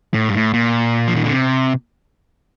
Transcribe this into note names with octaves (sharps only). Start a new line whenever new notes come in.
A2
G2
A2
A#2
F3
D#3
D3
C3